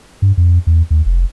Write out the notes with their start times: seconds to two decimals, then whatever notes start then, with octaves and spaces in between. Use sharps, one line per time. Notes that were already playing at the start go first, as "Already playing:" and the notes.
0.22 G2
0.37 F2
0.67 E2
0.91 D#2
1.06 F1